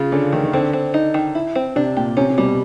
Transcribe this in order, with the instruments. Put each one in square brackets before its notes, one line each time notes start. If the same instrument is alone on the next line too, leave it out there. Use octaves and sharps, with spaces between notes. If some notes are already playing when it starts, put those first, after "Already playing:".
Already playing: [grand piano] C#3 [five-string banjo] F4
[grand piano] D3 [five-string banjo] C#4
[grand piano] D#3 [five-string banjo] A3
[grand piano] D#3
[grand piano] D3 [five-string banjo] C4
[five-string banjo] C4
D#4
D#3
E4
C4
[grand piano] C3 [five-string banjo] D4
[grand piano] A#2 [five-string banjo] G4
[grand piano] C3 [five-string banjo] C#4
[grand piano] C3
[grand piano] B2 [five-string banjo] G3